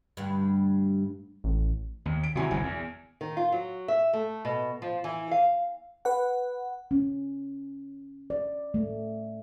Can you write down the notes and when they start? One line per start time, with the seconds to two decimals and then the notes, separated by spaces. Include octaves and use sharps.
0.17 D2 G2
1.44 A1
2.06 D#2
2.23 D7
2.35 C3 D#3 F#3 E4 G#5
2.51 G1 C2 A#2 G#5
2.63 E2
3.21 D#3
3.37 F4
3.52 F#3
3.88 E5
4.13 A3
4.45 B2
4.82 F3
5.04 E3
5.31 F5
6.05 B4 F#5
6.91 C#4
8.30 D5
8.74 A3